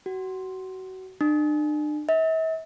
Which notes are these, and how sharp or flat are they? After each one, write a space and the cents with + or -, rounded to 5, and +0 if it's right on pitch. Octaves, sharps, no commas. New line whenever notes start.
F#4 +25
D4 +40
E5 -40